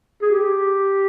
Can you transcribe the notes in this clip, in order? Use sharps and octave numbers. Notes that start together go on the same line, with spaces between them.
G#4
G4